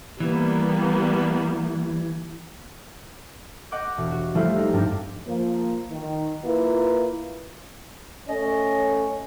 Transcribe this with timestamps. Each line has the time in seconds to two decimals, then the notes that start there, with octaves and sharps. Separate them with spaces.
0.20 E3 G3 A#3 B3
3.71 D#5 F#5 D6 F#6 G6
3.98 E1
4.11 F#4
4.35 F3 G3 A3 E4 C5 F5
4.55 A#3 D#4
4.73 G2 G3 C4 D4 D#4 G4
5.27 F3 A#3
5.91 D#3
6.44 A#3 E4 F4 B4
8.28 A3 C#4 D#5